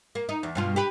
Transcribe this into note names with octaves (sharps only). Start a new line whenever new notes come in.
A#3
D#4
E2
G2 B2 F4
G4 B4